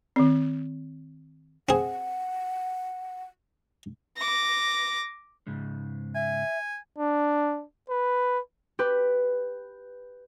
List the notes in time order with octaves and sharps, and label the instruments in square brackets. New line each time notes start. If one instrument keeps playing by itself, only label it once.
[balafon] D#3 C4
[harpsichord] C4 G#4 [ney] F#5
[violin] D6 A#6
[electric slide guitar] G#2 C#3 G#3
[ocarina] E5 [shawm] G#5
[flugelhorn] D4
B4
[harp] G4 B4